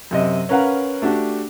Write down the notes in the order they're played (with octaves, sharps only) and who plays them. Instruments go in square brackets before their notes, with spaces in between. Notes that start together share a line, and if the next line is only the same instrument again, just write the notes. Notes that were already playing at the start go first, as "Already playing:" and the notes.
[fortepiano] F#2 C3 D#5
C#4 A#4 B4 F5 F#5 A#5
A3 D4 F#4 G4